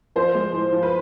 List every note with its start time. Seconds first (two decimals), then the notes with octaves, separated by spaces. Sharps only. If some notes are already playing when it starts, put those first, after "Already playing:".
0.16 F3 C5
0.35 G#3
0.53 A2
0.73 F3
0.83 B4